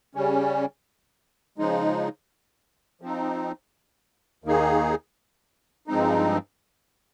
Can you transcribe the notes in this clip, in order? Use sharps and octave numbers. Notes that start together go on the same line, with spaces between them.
C#3 G3 C#4
C#3 F3 G#3 D#4
F3 C4 D#4
D#2 D#3 A#3 D#4 G#4
G2 F3 G#3 C4 D#4